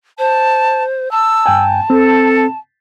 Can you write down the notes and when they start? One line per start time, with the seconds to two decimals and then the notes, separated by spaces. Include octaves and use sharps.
0.19 C5 A5
1.11 A5 E6
1.46 G2 G5 G#5
1.90 C4 A4